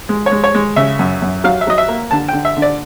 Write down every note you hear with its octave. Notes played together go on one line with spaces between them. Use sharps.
G#3
C#5
G#3
C#5
G#3
C#3 E5
F#2
F#2
F#3 F5
E5
F#3 D#5
E5
A#3
D3 A5
D3 G5
E5
D3
D5